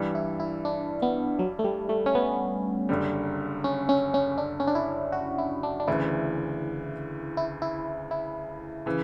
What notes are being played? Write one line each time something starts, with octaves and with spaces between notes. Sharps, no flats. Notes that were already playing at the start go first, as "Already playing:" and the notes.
Already playing: G2 E3 G3
E4
E4
D4
B3
F#3
A3
G3
A3
C#4
B3
F#1 F#2 D3 G3
C#4
C#4
C#4
D4
C#4
D4
E4
F#4
E4
D4
D4
D2 C#3 E3 E4
E4
E4
E4
C#3 E3